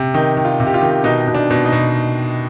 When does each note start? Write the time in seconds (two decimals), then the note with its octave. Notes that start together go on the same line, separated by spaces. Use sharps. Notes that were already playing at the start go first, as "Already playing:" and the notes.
Already playing: C3
0.14 D#3 D#4
0.37 D#3
0.45 F4
0.60 C3
0.67 G4
0.74 F4
0.82 D#3
1.04 B2 D#4
1.27 B2
1.35 D4
1.50 B2
1.65 D#4
1.72 B2